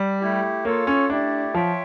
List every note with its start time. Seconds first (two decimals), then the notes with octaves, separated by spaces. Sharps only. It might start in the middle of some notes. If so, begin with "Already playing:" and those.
Already playing: G3
0.20 A3 E4 G4
0.65 A#3 F4 A4 C#5
0.87 C#4
1.10 A3 D4 E4 G4 D5
1.54 F3 F4 C#5 E5 G5